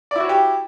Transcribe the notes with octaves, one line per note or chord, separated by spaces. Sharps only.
E4 F#4 G4 C#5 D5